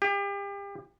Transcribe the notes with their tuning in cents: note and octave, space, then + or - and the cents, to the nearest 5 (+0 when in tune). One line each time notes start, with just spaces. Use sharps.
G4 +35